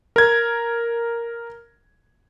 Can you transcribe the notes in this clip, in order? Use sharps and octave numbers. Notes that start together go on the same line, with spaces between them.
A#4 G#6